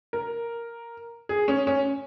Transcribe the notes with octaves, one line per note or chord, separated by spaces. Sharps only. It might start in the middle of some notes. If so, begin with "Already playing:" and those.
A#4
G#4
C#4
C#4